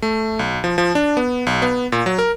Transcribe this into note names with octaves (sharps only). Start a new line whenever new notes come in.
A3
B1
F3
F3
D4
B3
B1
B3
A#2
F#3
A#4